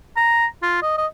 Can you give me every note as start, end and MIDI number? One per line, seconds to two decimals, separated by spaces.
0.17 0.46 82
0.62 0.79 65
0.83 0.93 75
0.98 1.06 75